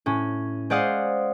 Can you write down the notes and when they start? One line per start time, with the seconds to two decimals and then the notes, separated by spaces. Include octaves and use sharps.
0.06 A2 C#4
0.70 G#3 C5 D5 F5 F#5 D#6